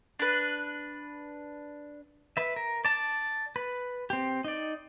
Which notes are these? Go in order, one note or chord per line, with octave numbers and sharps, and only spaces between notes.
D4 B4
B4 E5
A#4
D5 A5
B4
C4 G4
D#4 D5